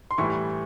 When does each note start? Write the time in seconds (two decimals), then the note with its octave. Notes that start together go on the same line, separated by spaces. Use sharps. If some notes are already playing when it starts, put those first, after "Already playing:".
0.11 C6
0.18 A2 E3 G3 C#6